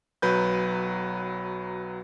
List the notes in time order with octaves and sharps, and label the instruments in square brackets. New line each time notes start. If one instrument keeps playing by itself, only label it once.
[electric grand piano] B1 F#3 B4 G6